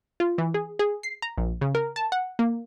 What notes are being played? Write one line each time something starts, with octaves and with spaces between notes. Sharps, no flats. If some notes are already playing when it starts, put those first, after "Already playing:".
F4
E3
G#4
G#4
C7
A#5
A#1
C#3
A#4
A5
F#5
A#3